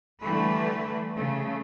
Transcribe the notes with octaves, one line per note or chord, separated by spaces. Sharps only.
D3 E3 G3 A3 B4
C#3 A3